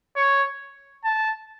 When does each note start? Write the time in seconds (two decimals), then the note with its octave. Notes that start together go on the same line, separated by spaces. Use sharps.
0.16 C#5
1.05 A5